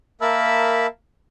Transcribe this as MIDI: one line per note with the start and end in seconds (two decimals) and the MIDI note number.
0.21 0.87 58
0.21 0.87 70
0.21 0.87 76
0.21 0.87 81
0.21 0.87 83
0.21 0.87 88